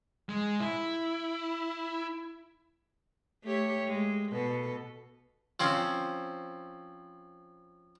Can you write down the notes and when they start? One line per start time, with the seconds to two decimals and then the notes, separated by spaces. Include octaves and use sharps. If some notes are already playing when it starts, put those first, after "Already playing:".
0.29 G#3
0.60 E4
3.44 A3 G4 C#5
3.88 G#3
4.32 B2 A4
5.60 F3 C4 C#4